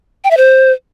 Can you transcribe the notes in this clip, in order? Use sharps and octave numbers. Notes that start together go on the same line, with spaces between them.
G5
E5
C5